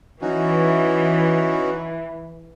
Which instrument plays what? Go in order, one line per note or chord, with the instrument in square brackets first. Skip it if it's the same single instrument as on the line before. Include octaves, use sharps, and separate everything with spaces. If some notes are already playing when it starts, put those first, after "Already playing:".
[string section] E3 [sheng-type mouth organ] C#4 D#4 F#4